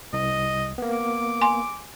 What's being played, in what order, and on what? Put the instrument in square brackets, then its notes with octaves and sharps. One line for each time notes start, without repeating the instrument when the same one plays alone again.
[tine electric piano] C2 [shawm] D#5
[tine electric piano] A#3 B3
[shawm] D6
[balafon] G#5 C6